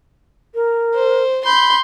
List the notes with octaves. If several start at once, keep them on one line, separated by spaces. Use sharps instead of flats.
A#4
C5
B5 C6 G6